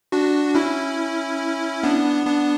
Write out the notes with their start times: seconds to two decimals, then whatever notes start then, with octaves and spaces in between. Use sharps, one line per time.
0.12 D4 F#4
0.55 C#4 E4
1.83 B3 D4
2.26 B3 D4